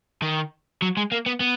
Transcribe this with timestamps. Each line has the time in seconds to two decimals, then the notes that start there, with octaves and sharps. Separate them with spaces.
0.22 D#3
0.82 F#3
0.97 G#3
1.12 A#3
1.26 B3
1.40 B3